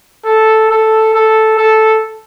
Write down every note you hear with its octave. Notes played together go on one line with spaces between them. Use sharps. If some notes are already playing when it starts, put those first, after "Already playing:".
A4
A4
A4
A4